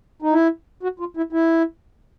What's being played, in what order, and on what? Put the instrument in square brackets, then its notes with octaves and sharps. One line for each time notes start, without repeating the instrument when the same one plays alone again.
[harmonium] D#4
E4
F#4
F4
E4
E4